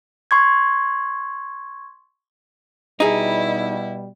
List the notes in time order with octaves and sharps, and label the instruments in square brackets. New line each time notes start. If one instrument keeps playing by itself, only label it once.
[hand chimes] C6 C#6 G#6
[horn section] B2 G3 [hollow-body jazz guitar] D#4 G#4 [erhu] E4